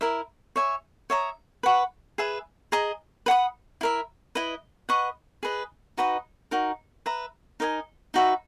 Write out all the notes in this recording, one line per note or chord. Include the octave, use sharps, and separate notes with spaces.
E4 A#4 E5
C#5 E5 G#5
C#5 E5 A#5 D#6
B4 F#5 C#6
G#4 B4 E5
G#4 D#5 A#5
B4 F#5 B5 D#6
E4 A#4 E5
E4 B4 D#5
B4 D#5 F#5 C#6
G#4 B4 D#5
D#4 F#4 B4 D#5
D#4 F#4 A#4
B4 E5 A#5
D#4 A#4 D#5 G#5
D#4 F#4 B4 E5